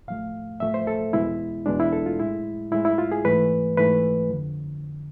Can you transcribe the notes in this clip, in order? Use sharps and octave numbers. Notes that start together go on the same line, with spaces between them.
A2 F3 A3 F5
A2 F3 A3 E5
C5
A4
E2 B2 G#3 E4
E2 B2 G#3 D4
E4
A4
F4
A2 G#3 E4
A2 G#3 E4
E4
F4
G#4
G#2 E3 A3 B4
G#2 E3 A3 B4
F2 D3 F3